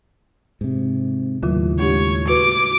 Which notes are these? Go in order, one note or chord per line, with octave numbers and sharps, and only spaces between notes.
G#2 C3
D#2 A2 C#3 F#3 F4
G#3 D4 G4 C#5
F#4 B4 D6